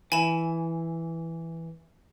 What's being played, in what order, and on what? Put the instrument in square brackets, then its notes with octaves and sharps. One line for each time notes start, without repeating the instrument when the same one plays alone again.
[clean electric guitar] E3 [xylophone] G#5 B5 E7